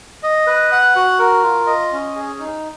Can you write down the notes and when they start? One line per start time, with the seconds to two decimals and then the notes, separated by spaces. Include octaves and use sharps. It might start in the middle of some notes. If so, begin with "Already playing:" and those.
0.23 D#5
0.47 B4
0.72 F#5
0.96 F#4
1.19 A#4
1.43 F4
1.67 D#5
1.92 C#4
2.16 G#4
2.39 D#4